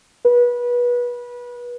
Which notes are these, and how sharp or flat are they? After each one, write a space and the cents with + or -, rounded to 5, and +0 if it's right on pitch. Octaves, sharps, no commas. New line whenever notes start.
B4 -25